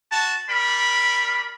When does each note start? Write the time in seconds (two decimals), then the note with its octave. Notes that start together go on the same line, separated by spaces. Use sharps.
0.12 F#4 A5
0.49 G3 A#4 B5